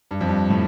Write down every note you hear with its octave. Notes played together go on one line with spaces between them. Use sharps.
G2
F2
G2
A2